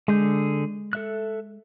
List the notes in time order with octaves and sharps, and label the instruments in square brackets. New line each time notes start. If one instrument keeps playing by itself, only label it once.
[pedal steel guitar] D3 G#4 G6 [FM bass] G#3
[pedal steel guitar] A4 E5 F#6